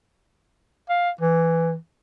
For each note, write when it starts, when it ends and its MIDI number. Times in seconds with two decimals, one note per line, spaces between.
0.90 1.10 77
1.21 1.75 52